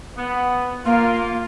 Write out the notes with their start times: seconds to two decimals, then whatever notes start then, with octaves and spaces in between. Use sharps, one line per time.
0.16 B3
0.85 A#3 F4